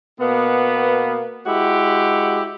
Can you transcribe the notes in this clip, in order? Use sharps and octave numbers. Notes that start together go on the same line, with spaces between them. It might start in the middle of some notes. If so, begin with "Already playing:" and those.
B2 A#3 B3
G#3 E4 F#4 G4